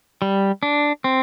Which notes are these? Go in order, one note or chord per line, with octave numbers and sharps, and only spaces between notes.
G3
D4
C4